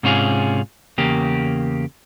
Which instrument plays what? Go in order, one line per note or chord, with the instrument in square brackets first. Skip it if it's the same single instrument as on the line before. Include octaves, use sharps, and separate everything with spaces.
[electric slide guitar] G#2 C3 C#4 F4 G#4
E2 C#3 A#3 G4